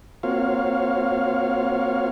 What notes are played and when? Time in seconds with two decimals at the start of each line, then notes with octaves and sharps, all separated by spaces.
0.23 A#3 C4 F4 F#4 C#5 F5